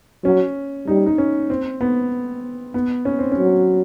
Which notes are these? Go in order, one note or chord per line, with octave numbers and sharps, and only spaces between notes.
F#3 C#4
G3 D#4
D#4
C#4
C4
B3
B3
C#4
C4
C#4
F#3